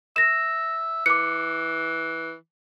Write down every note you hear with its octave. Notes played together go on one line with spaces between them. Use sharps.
E5 A#6 E7
E3 D6 C#7